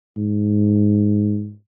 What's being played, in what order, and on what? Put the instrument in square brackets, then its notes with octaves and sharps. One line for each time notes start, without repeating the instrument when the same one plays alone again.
[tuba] G#2